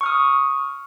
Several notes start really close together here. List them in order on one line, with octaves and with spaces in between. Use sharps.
C#6 F6 D#6